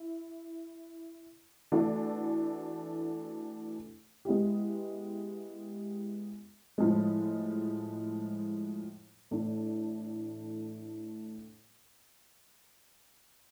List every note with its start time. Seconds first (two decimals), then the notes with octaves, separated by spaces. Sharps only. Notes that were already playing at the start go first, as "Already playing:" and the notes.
Already playing: E4
1.72 E3 A3 D4 F#4
4.25 G#3 B3 E4 G4
6.78 A2 F3 G#3
9.31 A2 E3 A3 D4